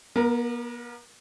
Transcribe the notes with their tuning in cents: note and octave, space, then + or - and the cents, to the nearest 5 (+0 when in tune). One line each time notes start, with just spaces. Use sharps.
B3 -45 A#4 +0